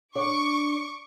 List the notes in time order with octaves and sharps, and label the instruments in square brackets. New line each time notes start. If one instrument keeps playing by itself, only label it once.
[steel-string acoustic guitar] D4 D5 [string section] C#6 D6